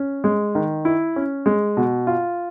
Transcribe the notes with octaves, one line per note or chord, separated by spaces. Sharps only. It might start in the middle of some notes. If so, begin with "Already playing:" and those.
Already playing: C#4
G#3
D#3
E4
C#4
G#3
B2
F4